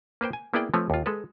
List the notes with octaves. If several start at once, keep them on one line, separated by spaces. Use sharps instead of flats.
A#3 B4 C5 G5
G#5
A#3 B3 E4 G#4 D5 G5
F3 A3 C4 B4 C#5
D#2 F4
G#3 A4 B4